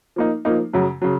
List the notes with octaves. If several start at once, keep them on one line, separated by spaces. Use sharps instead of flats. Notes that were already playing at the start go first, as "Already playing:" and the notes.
F3 A#3 D#4
F3 A#3 D#4
F#2 C#3 F#3
C#3 F#3